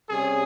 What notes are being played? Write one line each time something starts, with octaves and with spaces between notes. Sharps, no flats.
C3 G3 C#4 G#4